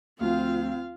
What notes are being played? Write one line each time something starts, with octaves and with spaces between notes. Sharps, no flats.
D2 F3 C4 F4 F5